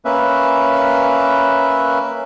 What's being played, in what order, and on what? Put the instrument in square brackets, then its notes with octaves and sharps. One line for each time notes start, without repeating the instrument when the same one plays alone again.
[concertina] A#3 C#4 B4 E5